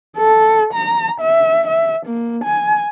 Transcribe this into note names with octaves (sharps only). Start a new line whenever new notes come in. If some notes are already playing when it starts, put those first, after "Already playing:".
A4
A#5
E5
E5
A#3
G#5